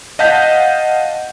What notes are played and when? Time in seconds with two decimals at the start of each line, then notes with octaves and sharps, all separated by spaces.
0.19 D#5 F5 F#5 A5 G6 B6